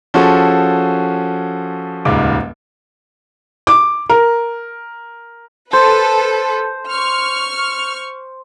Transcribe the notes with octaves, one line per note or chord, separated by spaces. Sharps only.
F3 C#4 F4 F#4 G#4 A4
D#1 C#2 G#2 D6
D6
A#4
A4 B4 C5
C#6 F6